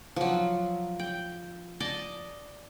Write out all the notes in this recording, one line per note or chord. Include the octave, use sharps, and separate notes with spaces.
F3 F#3
G5
D5 D#5 A5